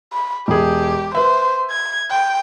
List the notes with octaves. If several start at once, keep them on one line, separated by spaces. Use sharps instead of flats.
B5
E1 G4 G#4
B4 C5 E5
G#6
G5